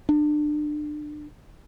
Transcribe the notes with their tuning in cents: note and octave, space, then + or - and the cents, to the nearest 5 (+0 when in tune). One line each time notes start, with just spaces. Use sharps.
D4 +30